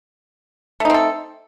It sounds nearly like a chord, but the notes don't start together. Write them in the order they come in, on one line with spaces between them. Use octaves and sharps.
A3 D#4 C4 A4